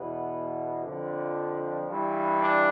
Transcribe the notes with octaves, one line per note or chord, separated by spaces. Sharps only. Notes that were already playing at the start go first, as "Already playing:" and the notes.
Already playing: E2 B2 B3
F2 D3 F3 D4
G2 E3
D4